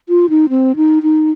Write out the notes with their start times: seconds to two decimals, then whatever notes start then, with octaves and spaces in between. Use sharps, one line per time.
0.09 F4
0.30 D#4
0.49 C4
0.76 D#4
1.03 D#4